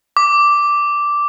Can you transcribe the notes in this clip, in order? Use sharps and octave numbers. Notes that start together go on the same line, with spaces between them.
D6